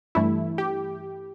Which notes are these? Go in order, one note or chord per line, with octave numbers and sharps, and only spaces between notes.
G2 E3 A3 E4
G4